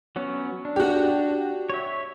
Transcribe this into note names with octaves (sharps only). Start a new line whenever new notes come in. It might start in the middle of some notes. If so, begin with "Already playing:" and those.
F#3 B3 C#4
D4
F#4 G4
C#5 E5